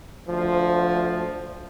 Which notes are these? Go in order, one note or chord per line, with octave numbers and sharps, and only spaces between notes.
D2 F3